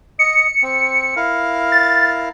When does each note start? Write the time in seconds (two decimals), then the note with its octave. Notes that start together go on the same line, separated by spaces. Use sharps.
0.19 D#5 C#7
0.62 C4
1.16 E4 A#4 F5
1.72 A6